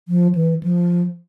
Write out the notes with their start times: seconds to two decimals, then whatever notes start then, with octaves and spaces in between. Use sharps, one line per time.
0.08 F3
0.35 E3
0.63 F3